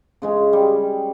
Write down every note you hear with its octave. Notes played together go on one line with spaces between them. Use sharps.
C#3 G#3 C#4
G3